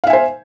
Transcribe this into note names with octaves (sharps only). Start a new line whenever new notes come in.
C5 E5 F5 G#5